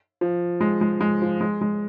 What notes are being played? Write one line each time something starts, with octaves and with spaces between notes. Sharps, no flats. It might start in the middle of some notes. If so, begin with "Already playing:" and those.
F3
G#3
G#3
G#3
F3
G#3
G#3